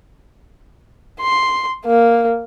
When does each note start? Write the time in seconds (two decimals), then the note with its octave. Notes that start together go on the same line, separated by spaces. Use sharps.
1.21 C6
1.85 A#3